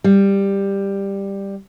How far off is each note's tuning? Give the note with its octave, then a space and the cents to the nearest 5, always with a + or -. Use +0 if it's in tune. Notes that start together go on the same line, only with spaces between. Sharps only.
G3 +10